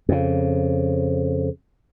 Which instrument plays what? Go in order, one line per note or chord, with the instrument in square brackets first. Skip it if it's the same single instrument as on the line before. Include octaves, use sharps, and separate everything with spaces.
[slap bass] F2 C#3